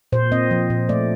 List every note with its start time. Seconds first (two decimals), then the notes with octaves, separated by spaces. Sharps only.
0.12 A#2 C5
0.32 C4 D#5
0.51 F3
0.70 A#2
0.89 A3 D5